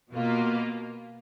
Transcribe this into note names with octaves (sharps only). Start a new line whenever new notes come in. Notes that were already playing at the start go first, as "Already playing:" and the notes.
B2 A#3 F4